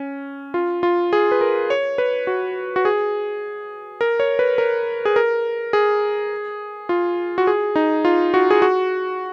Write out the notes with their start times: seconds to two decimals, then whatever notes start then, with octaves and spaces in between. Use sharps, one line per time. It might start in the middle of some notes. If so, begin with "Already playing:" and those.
Already playing: C#4
0.54 F4
0.83 F4
1.13 G#4
1.31 B4
1.41 A#4
1.70 C#5
1.98 B4
2.27 F#4
2.76 F#4
2.85 G#4
4.01 A#4
4.20 C#5
4.39 B4
4.58 A#4
5.05 G#4
5.16 A#4
5.73 G#4
6.89 F4
7.38 F#4
7.47 G#4
7.76 D#4
8.05 F4
8.34 F#4
8.51 G#4
8.62 F#4